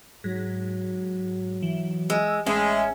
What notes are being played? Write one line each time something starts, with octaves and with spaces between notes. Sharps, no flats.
G#2 F#3
E3
G#3 E6
A1 G#3 C#4 G#4 E5